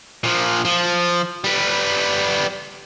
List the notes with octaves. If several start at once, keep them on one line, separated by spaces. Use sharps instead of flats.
A#2 F3
F3
G3 B3